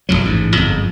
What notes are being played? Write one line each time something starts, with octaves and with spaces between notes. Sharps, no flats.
D#1 A#1 F2 F#3
A1 G#2
G1 F2 G#2